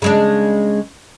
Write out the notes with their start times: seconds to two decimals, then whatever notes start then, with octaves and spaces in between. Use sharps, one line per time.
0.02 C#3 G#3 D4